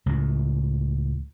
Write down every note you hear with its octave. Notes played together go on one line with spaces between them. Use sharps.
C#2 A2